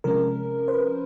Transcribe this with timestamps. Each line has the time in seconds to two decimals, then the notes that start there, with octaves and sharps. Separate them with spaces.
0.04 C3 F3 G#3 C#4 A#4
0.68 C5
0.73 B4